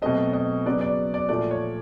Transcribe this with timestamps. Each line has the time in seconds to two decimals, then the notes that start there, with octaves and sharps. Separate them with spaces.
0.02 B2 F#3 A3 C4 D#5
0.33 D#5
0.66 C#3 F#3 B3 D5
0.81 D5
1.14 D5
1.29 A#2 F3 A3 D5
1.51 C#5